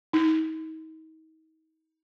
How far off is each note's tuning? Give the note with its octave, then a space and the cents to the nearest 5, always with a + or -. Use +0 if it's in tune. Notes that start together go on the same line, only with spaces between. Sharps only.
D#4 +40